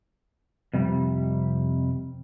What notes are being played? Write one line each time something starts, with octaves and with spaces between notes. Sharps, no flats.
F2 C3 G3